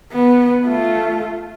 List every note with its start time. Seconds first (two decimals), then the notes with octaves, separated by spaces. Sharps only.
0.12 B3
0.66 A3 F4